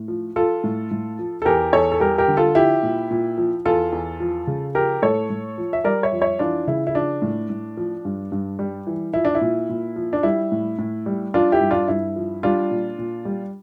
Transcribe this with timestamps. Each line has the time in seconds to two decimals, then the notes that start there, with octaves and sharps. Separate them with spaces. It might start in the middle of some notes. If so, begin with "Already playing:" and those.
Already playing: A2
0.08 F3
0.36 F3 F4 A4
0.64 A2
0.91 A2
1.19 F3
1.42 A4
1.45 E2 G4 A#4
1.73 E2 A4 C#5
1.92 A4
2.00 G3 G4 A#4
2.18 G4 A#4
2.28 D3
2.37 F4 A4
2.55 F3 E4 G4
2.83 A#2
3.11 A#2
3.38 F3
3.65 E2 F4 A4
3.92 E2
4.20 F3
4.47 C#3
4.75 F3 G4 A#4
5.02 A2 A4 C#5
5.30 A2
5.58 F3
5.73 E5
5.84 G3 A#4 D5
6.03 C#5 E5
6.12 F2
6.21 C#5 E5
6.39 E3 D4 F4
6.67 C#3 E4
6.87 E4
6.94 F3 D4
7.22 A2
7.50 A2
7.77 F3
8.05 G2
8.32 G2
8.59 G3
8.87 E3
9.13 F3 E4
9.25 D4
9.35 E4
9.41 A#2
9.69 A#2
9.96 F3
10.13 D4
10.23 G3 E4
10.52 A2
10.79 A2
11.06 G3
11.34 F3 D4 F4
11.52 E4 G4
11.61 G2
11.71 D4 F4
11.88 G2 E4
12.16 F3
12.43 G3 D4 F4
12.71 A#2
12.99 A#2
13.25 G3